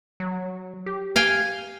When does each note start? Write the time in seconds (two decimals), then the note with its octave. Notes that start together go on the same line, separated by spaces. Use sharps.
0.20 F#3
0.86 G4
1.16 F5 G5 G#5